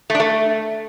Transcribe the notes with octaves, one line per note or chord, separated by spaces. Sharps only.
A3
D4
A3